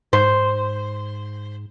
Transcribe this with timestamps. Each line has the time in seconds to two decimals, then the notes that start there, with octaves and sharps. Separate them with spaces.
0.13 G#2 C5